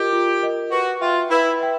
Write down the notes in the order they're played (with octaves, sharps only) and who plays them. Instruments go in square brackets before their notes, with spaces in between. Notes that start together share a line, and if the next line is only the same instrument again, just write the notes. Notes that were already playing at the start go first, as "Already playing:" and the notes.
Already playing: [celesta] F4 A#4 D#5 [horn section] G4
[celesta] F4
A#4 D#5
[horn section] F#4 [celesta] B4
[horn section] F4 [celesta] E5 G5
[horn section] E4 [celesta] B4
[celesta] E5 G5